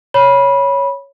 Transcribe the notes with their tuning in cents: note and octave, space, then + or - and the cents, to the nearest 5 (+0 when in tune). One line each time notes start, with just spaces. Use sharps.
C#5 +0 B5 -15